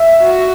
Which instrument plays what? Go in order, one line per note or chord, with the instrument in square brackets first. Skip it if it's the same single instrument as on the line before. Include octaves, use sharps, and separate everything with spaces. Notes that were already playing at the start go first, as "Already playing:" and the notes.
Already playing: [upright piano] E5
[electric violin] F#4